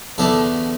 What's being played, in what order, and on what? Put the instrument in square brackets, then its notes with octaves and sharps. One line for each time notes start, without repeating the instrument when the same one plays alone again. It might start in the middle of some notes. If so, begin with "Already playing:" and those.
[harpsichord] E2 D3 A3 D4 A4